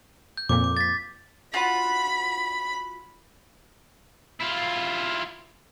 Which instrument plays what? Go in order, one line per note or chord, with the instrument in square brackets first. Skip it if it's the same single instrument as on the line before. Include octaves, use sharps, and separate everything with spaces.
[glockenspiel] G6
[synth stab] F2 A#2 [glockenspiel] D6
[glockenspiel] D6
A6 B6
[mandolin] F4 F#4 F#5 [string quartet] B5
[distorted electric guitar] E4 F4